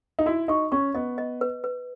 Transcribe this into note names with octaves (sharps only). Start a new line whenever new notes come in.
D#4
E4 F#4
D#4 C#6
C#4 C#6
B3 D#5
D#5
B4
B4